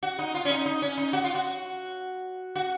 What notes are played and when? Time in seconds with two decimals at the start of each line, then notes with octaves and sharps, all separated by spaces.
0.03 F#4
0.19 D#4
0.34 F4
0.45 C#4
0.50 D#4
0.66 D#4
0.82 C#4
0.98 D#4
1.13 F#4
1.24 F4
1.35 F#4
2.55 F#4